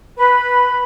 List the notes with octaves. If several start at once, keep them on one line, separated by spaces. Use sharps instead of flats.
B4 B5